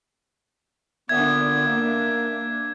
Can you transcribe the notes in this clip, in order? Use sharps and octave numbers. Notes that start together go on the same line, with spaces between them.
A#2 D3 B3 D4 E5 G#6
A#3